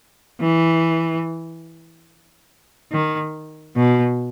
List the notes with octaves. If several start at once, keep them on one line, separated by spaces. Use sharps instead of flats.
E3
D#3
B2